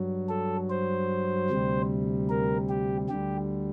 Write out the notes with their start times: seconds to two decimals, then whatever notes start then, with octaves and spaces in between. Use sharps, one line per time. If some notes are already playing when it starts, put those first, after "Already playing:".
Already playing: G2 F#3
0.29 A4
0.70 C5
1.50 D2 C3 G3
2.30 A#4
2.69 G4
3.09 D2 D3 G3 G4